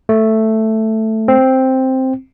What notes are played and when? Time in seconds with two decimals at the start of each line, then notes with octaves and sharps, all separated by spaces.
0.09 A3
1.28 C4